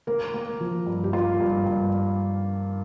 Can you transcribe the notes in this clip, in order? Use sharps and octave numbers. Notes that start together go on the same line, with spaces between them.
A#3 A#4
A#3
F3
G2
G4
A#3 F4
G2
G2